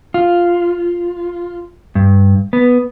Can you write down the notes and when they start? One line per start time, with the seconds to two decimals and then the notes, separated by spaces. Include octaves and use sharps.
0.14 F4
1.95 G2
2.53 B3